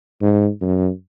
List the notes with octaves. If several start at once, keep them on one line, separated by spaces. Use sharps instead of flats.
G#2
F#2